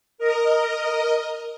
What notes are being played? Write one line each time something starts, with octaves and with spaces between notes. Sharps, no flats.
A#4 D#5